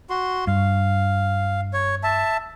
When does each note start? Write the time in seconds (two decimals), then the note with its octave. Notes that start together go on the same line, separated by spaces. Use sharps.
0.10 F#4 C6
0.47 G2 F5
1.73 C#5
2.03 E5 A5